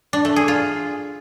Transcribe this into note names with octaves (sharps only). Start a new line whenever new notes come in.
D4
A3
G#4
F4